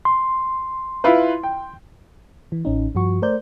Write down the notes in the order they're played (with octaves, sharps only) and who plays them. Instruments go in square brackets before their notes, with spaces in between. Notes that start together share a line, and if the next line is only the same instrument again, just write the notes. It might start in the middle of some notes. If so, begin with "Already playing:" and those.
[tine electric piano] C6
[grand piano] E4 F4 B4
G5
[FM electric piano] E3
A1 C#4 D#4
G2 F3 F#4 C#6
A3 A#4 C5 D5 G6